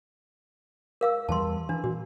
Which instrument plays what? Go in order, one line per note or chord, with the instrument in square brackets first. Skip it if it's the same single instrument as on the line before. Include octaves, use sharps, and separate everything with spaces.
[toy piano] A#4 F5 E6
[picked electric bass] E2 E3 G3 [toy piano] A5 C6
[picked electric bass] E3 [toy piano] D4
[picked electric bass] A#2 [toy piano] F#4